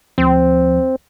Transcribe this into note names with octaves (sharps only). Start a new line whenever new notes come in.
D2 F3 C4